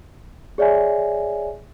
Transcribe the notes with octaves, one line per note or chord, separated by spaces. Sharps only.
G#4 C#5 D5 E5 G#5